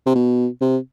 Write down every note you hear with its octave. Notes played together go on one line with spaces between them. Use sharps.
C3
B2
C3